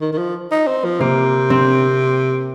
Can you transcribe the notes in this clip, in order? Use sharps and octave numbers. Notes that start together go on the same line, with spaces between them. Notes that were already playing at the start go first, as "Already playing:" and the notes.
D#3
D#3
F3
D#4
C4
F3
C3 A#3
C4